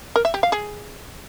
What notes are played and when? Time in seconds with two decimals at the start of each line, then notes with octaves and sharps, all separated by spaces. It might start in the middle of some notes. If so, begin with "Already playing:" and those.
0.16 A#4
0.25 E5
0.34 G4
0.43 F5
0.52 G#4